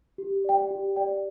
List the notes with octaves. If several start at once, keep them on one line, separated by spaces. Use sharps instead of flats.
G4
D5 G5
G4
D5 G5